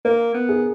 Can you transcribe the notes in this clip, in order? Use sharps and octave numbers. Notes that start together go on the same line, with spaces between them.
A#3 A#4
B3
G#4